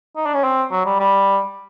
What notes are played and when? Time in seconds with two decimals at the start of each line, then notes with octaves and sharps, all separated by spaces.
0.16 D#4
0.26 D4
0.34 C#4
0.44 C4
0.71 F#3
0.86 G3
0.99 G3